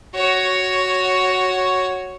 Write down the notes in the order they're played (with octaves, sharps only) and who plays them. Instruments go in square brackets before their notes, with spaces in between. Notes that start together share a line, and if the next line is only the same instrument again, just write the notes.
[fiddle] F#4 C#5